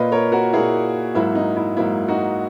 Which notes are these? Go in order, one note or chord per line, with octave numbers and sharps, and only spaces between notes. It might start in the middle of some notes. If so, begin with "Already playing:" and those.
Already playing: A#2 A#3 B4 D#5
A#4 C#5
F#4 A#4
A#2 A#3 E4 G#4
G#2 F#3 A#3 E4
D#4
E4
G#2 F#3 A#3 E4
D#4 F#4